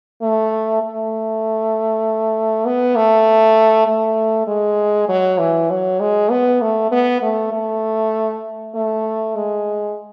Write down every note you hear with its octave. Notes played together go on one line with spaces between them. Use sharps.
A3
A3
B3
A3
A3
G#3
F#3
E3
F#3
G#3
B3
A3
B3
A3
A3
A3
G#3